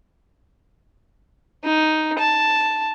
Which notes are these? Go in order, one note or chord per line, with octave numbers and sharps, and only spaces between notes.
D#4
A5